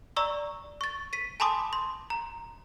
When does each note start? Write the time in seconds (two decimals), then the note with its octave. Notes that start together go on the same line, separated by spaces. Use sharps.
0.16 D5 A#5 C#6 E6
0.81 C#6 A6
1.13 B6 D#7
1.40 G#5 A5 B5 C6 D6 D#6
1.73 C6
2.10 A#5